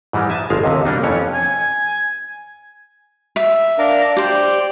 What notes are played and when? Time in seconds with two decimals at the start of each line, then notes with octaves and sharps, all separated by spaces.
0.13 G#2 E3 G3 G#3
0.30 E5 G#5 A5
0.50 G1 F3 G#3 F5
0.64 D#2 C3
0.85 G3 A#3 D4 D#4
1.03 F2 E3 C#4 C#5
1.34 G#5
3.36 E5
3.78 D4 A#4 F5
4.17 G4 C5 D5